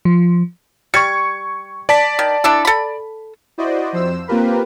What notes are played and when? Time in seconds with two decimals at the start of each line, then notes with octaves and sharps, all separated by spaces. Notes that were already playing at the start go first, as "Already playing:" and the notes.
0.05 F3
0.94 G3 C#6 G#6 C#7
1.89 D5 A5 B6
2.19 D#3
2.44 D4 E4 A4
2.65 A4 B5
3.58 E4 F#4 C5 D5 D#5
3.93 F2 C5 E6 E7
4.28 A#3 C4 F4 G4 A#4 B4